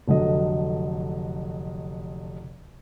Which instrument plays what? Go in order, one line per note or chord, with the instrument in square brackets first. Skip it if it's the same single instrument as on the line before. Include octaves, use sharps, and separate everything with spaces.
[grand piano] F1 D3 F#3 D#5